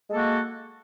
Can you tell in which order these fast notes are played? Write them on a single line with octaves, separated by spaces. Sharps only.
G#3 A4 A#3 F#4